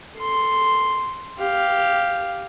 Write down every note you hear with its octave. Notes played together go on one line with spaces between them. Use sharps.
A4 C6
G4 F5